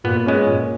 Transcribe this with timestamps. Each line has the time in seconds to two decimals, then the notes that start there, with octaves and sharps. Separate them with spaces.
0.04 A#2 B3
0.26 G#3 B3 C#4
0.47 A#2